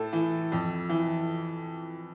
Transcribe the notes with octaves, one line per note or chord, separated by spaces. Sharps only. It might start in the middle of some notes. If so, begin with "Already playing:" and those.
Already playing: A2 A4
E3
F2
E3